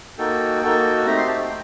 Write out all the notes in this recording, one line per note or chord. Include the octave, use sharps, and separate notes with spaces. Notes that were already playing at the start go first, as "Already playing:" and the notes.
A#3 D#4 F#4 A4 G5
A#3 D#4 F#4 A4
A3 C4 D#4 G4 A#5
C6
A5
G5